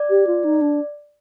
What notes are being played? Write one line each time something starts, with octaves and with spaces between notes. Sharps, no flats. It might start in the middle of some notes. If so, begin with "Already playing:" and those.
Already playing: D5
G4
F4
D#4
D4